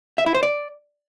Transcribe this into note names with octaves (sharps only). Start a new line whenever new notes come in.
E5
E4
C5
D5